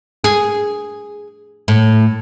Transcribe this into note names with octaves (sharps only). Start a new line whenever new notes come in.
G#4
A2